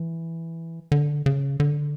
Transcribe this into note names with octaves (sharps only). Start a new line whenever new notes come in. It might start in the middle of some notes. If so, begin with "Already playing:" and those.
Already playing: E3
D3
C#3
D3